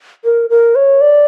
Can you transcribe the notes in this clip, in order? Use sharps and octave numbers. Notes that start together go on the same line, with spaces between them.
A#4
A#4
C#5
D5